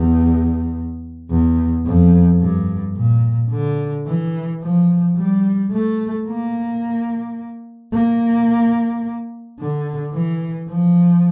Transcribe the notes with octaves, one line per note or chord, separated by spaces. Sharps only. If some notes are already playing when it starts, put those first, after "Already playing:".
Already playing: E2
E2
F2
G2
A#2
D3
E3
F3
G3
A3
A#3
A#3
D3
E3
F3